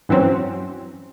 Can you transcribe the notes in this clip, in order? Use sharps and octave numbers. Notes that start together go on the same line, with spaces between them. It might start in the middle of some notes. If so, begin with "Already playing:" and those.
G2 E3 F#3 C4 C#4